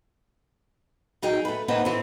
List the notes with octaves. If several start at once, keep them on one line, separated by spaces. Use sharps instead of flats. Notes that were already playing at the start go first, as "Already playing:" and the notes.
F#3 D#4 G#4 G5
A3 B4
A#3 C4 D#4 E4 B4 F#5
A#2 E3 C4